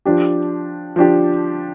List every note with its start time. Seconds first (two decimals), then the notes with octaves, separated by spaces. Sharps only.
0.05 F3 D4 G4
0.96 F3 D4 G4